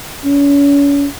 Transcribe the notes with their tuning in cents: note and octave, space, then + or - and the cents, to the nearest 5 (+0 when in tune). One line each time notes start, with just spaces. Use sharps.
C#4 +40